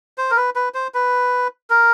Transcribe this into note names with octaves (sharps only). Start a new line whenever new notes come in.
C5
A#4
B4
B4
C5
B4
A#4